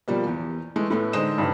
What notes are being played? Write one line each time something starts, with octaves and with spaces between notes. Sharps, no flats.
B2 F3 G3 A#3
E2
E3 G#3 A3
A2 A3 B3
D3 G#3 D#4 C5 D#5 E7
G2 C#3 E3